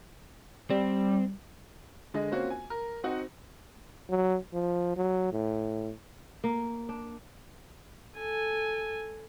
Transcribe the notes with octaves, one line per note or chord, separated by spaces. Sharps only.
G3 C4
D3 G#3 D#5
A#3 C4 C#4 F4 F#4 C5
G#5
A#4
C4 D#4 F#4 F#5
F#3
F3
F#3
A2
A#3
D4
A4 G#5